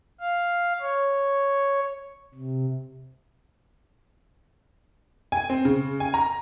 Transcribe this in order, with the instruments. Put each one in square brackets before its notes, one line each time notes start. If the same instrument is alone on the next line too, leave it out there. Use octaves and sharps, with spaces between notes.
[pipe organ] F5
C#5
C3
[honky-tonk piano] G#5
C4
C#3
G#5
A#5